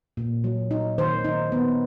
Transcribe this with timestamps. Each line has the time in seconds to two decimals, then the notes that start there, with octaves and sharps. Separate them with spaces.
0.17 A#2
0.44 F#3
0.71 D#4
0.98 D#3 C5
1.24 D#4
1.52 B3